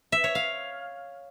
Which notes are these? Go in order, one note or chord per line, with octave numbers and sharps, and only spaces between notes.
E5
C#5
F5